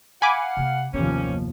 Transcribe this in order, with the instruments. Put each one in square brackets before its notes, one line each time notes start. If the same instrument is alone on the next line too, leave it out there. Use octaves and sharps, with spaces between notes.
[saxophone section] F5 F#5 [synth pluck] G#5 B5 D6
[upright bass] C3 A#3
[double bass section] F#1 D#2 F3 [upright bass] C3 B3 [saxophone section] G3 A#3 C#4